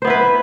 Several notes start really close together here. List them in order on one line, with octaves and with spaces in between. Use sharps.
C5 B3 E4 B4